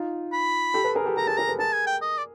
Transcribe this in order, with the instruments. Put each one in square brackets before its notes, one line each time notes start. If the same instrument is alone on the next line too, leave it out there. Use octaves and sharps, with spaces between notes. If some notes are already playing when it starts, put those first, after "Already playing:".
Already playing: [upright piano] D#4 F4
[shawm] B5
[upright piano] G4 A4
A4 B4
G#4 A#4
G4 A4
[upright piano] G4 A4 [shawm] A#5
[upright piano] G#4 A#4 [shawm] A5
[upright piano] G#4 A#4 [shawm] A#5
[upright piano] A4 B4
[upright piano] G#4 A#4 [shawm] A5
[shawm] G#5
G5
D#5
D5